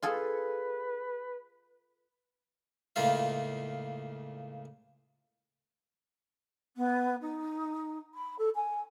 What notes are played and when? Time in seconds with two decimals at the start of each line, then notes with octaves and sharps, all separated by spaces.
0.02 F4 G#4 A4 B4
2.96 C#2 A2 C#3 A#3 F4 F5
6.76 B3
7.21 D#4
8.14 B5
8.38 A4
8.54 G#5